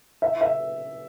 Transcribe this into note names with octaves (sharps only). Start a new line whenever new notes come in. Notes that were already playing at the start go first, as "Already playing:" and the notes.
E5
E5